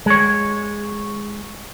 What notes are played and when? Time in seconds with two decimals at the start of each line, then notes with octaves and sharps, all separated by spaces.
0.06 G#3 C#5